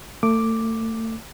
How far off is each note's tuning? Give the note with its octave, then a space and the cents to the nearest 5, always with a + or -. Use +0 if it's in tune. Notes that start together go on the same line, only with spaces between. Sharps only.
A3 +35 D6 +0